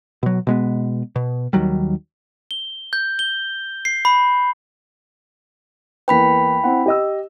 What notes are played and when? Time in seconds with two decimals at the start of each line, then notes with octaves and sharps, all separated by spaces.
0.23 B2 F#3
0.47 B2 G#3 B3
1.16 B2
1.53 D#2 D#3 F#3 G3
2.51 G7
2.93 G6
3.19 G7
3.85 C7
4.05 B5
6.08 E2 A#3 B4 G5 B5 B6
6.64 C4 E4 F#5
6.86 G4 D#5 E6